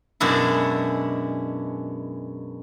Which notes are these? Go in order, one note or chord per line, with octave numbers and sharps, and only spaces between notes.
F#2 B2 G#3 D4 E4